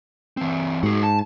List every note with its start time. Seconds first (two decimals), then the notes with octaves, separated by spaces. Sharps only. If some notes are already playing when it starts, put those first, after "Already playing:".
0.37 E3 C4
0.83 G#2 F#4 G#4
1.03 A5